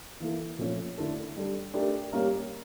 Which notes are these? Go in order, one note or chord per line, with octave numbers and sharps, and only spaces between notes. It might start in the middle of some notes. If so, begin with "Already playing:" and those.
E3 A#3 E4 A4
A#2 F3 A3 C#4
D3 A3 E4 A4
G3 D4 A4
A3 D4 G4 A#4
G3 A#3 C#4 G4 A#4